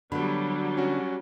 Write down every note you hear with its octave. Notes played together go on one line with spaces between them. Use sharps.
D3 F#3 G3 B3 B5
C#4 F#4